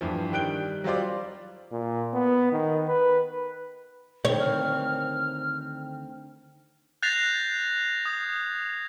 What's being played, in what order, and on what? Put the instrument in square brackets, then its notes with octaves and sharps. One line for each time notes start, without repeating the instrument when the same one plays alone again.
[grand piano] G2 E3 F3
D#3 G3 G5 F#6 D7 G7
F#3 G3 F4 C5 D5
[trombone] A#2
B3
D#3
B4
[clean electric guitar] D2 D#3 C4 [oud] C#5
[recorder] F6
[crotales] F#6 G6 A6 A#6 C7 F7
D#6 G#6